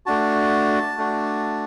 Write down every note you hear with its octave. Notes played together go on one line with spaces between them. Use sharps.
A3 D4 F#4 A5
A3 D4 F#4